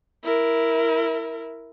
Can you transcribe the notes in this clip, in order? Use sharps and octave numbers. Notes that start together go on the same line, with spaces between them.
E4 A#4